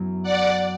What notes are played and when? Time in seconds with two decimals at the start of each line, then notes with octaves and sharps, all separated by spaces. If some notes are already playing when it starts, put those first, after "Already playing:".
Already playing: F#2 E3 B3
0.23 D5 F#5